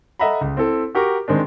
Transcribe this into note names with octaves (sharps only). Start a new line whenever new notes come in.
A4 D#5 E5 F#5 A#5 B5
C#2
C4 E4 A4
F#4 G4 A#4 C#6 D6
D#3 G#3 C4 D4